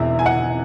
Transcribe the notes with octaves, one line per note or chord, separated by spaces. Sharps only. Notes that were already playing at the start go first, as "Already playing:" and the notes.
Already playing: E1 E2 E5
G#5
F#5